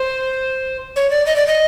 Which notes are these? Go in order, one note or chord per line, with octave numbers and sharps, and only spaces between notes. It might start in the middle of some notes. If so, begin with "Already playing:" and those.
Already playing: C5
C#5
D5
D#5
D5
D#5